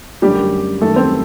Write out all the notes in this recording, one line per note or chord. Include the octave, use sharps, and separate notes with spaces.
F#2 D3 G3 A3 G4
F#2 D#3 G3 A3 A4
C4 C5